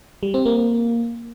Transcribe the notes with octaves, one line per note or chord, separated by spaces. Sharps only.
G3
C4
A#3